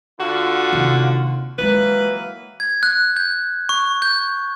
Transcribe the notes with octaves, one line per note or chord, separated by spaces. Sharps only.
D3 F4 F#4
D#2 C3
E3 F#3 G#3 A#3 F4 B4
G#6
F#6
G6
C#6
G6